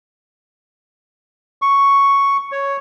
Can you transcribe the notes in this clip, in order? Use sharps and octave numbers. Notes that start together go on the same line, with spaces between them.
C#6
C#5